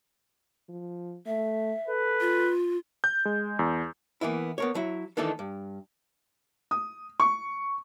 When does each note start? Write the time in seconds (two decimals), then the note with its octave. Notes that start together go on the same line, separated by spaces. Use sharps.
0.69 F3
1.26 A3 E5
1.88 A4 B4
2.21 F4
3.04 G6
3.25 G#3
3.59 E2
4.21 E3 A#3 B3 E4
4.58 B3 A#4 C#5
4.75 F#3 E4
5.17 D#3 E3 A3 D4 D#4 A4
5.39 G2
6.71 D#6
7.20 C#6